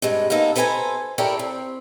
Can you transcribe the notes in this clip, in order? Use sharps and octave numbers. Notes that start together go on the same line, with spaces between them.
G2 C3 G#3
A#3 B3 D#4 A4
A4 B4 C5 G5 G#5 A#5
E4 G4 A4 A#4 C#5 D5
C4